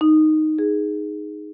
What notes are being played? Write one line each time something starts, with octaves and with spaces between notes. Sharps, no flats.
D#4
G#4